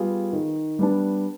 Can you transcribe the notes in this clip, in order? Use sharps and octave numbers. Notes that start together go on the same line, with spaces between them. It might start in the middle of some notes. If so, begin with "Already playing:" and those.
Already playing: G3 B3 F4 G#4
D#3
G3 B3 D4